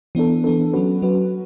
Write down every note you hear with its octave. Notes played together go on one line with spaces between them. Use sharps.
E3 B3 D4 A4
E3 B3 D4 A4
F#3 C#4 F#4 B4
F#3 C#4 F#4 B4